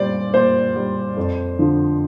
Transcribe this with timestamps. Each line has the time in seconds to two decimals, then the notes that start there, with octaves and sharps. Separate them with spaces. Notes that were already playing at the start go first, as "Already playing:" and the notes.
Already playing: A#2 G3 C5 D5
0.33 A#2 C5
0.76 G3
1.17 F2
1.59 D3 F3